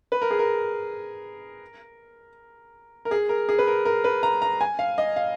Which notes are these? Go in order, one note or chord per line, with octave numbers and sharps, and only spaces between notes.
B4
A#4
G#4
A#4
A#4
G#4
A#4
G#4
B4
A#4
A#4
B4
A#5
A#5
G#5
F5
D#5
F5